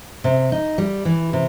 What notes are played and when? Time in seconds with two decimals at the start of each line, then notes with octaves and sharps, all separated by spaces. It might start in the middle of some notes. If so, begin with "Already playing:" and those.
0.24 C3
0.52 D#4
0.78 G3
1.05 E3
1.33 C3